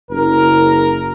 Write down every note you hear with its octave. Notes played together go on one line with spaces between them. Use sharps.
F#1 A#4